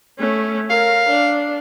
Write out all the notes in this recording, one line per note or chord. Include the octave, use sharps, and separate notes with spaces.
A3 C#4
A#4 F5
D4